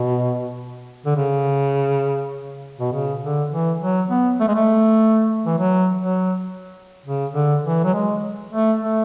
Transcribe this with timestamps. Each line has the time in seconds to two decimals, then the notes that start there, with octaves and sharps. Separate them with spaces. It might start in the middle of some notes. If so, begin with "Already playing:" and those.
Already playing: B2
1.06 D3
1.16 C#3
2.80 B2
2.93 C#3
3.22 D3
3.52 E3
3.81 F#3
4.10 B3
4.40 A3
4.48 G#3
4.55 A3
5.46 E3
5.58 F#3
6.02 F#3
7.06 C#3
7.34 D3
7.65 E3
7.84 F#3
7.94 G#3
8.53 A3
8.81 A3